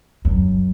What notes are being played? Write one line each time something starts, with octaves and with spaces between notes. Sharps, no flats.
F#2